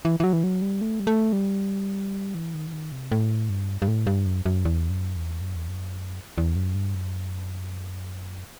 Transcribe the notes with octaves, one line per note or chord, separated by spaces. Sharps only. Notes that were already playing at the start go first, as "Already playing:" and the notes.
E3
E3
F#3
E3
F#3
G3
A3
G3
A3
G3
E3
D#3
E3
D#3
C3
A2
G2
G2
A2
G2
F#2
F#2
E2
F#2
E2
F#2
E2
F#2
E2
F#2
G2
F#2